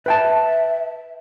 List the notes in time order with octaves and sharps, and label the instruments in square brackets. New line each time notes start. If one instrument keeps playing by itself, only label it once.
[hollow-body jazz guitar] B4 G5 A5 [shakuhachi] E5